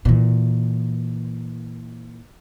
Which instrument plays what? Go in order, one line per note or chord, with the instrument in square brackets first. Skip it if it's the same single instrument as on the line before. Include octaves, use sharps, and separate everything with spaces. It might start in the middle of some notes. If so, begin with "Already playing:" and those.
[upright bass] A#2 E3